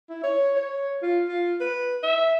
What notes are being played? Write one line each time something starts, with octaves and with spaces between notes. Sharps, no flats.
E4
C#5
C#5
F4
F4
B4
E5